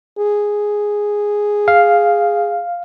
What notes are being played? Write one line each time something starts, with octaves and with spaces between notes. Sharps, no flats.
G#4
F5